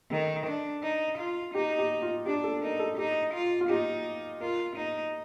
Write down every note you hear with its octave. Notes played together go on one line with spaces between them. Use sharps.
D#3 A4
D4
D#4
F4
D#4 G4
G4
F4
D4 G4
A4
D#4 A#4
A4
D#4 G4
F4
F4
D#4 G4
F4 A#4
D#4 D#5